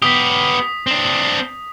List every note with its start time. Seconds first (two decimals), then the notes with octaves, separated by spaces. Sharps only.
0.02 B3 G4 D#6 B6
0.87 C4 D4